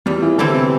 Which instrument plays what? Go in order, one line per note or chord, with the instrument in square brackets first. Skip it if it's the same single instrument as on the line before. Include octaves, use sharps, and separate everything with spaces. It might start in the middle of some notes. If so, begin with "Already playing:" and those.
[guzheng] E2 [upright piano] G3
[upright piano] E3
[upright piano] D3 [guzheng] E3 C4 E4 G4
[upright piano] C3